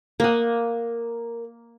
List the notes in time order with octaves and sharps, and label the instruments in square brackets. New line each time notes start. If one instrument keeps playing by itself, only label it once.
[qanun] A#3 D#5 [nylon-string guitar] A#4 F#5